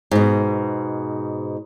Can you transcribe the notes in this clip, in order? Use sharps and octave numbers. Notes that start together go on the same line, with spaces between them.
G#2 B2